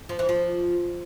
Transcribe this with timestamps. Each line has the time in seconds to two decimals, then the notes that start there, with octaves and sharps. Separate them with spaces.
0.09 F3
0.19 E3
0.29 F3